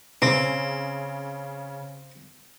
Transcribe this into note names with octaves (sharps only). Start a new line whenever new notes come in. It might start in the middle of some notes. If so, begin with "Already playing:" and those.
C#3 C4